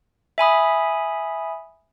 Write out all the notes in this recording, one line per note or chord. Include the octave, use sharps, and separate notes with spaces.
E5 G#5 B5 D#6